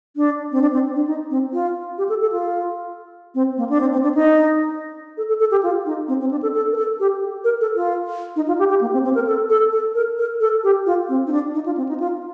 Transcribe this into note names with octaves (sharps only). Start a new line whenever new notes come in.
D4
C4
D4
C4
D4
D#4
C4
F4
G4
A4
A4
F4
C4
A#3
D4
C4
C4
D4
D#4
A4
A4
A4
G4
F4
D#4
C4
C4
D4
A4
A4
A#4
A4
G4
A#4
A4
F4
D#4
F4
G4
G4
A#3
C4
C4
A#4
A4
A4
A4
A#4
A#4
A4
G4
F4
C4
D#4
D4
D#4
F4
C4
D#4
F4